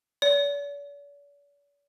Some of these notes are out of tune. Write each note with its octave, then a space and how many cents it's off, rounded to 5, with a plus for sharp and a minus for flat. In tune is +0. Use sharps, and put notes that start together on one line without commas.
D5 -45